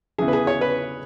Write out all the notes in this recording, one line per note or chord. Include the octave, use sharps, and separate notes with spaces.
E2 C#3 E3 G#4
B4
G#4
C#5
B4